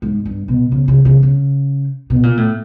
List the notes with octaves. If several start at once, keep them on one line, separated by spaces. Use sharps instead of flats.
G#2
G2
B2
C#3
C#3
C#3
C#3
B2
A#2
A2